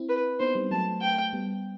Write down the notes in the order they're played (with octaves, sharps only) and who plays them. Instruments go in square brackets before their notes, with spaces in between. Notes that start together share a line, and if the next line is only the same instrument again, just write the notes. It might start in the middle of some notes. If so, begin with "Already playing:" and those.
Already playing: [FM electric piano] C4 E4
[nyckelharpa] B4
[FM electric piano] B3 D#4 [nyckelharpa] C5
[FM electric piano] G3
[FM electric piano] F#3 A3 [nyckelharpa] A5
[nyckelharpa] G5
[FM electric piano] G3 B3